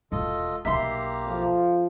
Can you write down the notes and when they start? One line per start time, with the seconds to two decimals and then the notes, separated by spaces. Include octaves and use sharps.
0.12 E1 F4 A4 D#5
0.65 B1 A#3 B3 G4 E5 A#5 C6
1.25 F2 F3